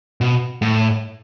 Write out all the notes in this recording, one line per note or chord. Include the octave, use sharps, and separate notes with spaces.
B2
A2